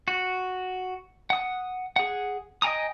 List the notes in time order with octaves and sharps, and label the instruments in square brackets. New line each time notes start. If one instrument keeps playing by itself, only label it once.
[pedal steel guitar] F#4
F#5 D#6
G#4 F#5
D#5 G5 G#5 A#5 D#6